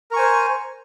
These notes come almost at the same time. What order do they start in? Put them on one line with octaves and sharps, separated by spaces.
A#4 C#6 G#5 C5